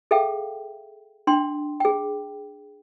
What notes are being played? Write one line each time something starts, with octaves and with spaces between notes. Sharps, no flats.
G#4 A4 E5 F5 G5
D4 G5 C6
G#4 G5